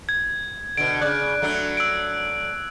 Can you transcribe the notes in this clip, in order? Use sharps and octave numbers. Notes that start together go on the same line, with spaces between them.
G#6
B2 D3 D7
C#3 D5 F#6
F#3 A3 D4
E6 D7